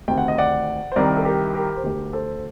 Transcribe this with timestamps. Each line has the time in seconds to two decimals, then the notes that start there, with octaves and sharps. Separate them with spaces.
0.08 D2 C3 D#3 G5
0.18 F#5
0.28 D#5
0.38 D5 F#5
0.92 C5
0.96 C2 C3 D#3 A#4 D5
1.16 A4
1.25 G4 A#4
1.54 G4 A#4
1.76 C5
1.83 D2 D3 G4 A#4
2.13 A4 C5